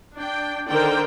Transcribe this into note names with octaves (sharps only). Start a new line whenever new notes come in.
D4 G5
D3 D#3 A#4 C5 D5 G5